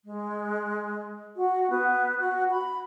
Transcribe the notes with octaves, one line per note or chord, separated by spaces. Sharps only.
G#3
F#4
B3
F#4
B5